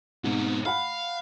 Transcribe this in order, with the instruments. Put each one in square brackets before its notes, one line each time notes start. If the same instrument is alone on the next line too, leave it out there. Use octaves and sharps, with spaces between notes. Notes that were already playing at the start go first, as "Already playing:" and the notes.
[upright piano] G#2 [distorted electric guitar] B2 C4
[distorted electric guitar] F5 [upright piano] F#5 B5 F6